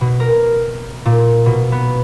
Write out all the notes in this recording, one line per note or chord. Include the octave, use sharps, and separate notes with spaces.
B2
A#4
A#2
B2
B3